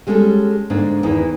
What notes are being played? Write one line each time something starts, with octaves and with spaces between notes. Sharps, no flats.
G3 G#3 C#4 G4 A4
G#2 D3 A#3 D4
E2 D#3 E3